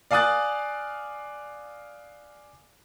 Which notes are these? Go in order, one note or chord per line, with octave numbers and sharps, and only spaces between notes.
D5 F5 G#5 D#6 F#6 A6